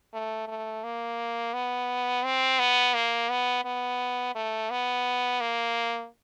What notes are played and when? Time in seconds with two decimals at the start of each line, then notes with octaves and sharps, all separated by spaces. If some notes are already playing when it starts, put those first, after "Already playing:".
0.14 A3
0.48 A3
0.84 A#3
1.54 B3
2.25 C4
2.60 B3
2.95 A#3
3.30 B3
3.65 B3
4.35 A3
4.71 B3
5.41 A#3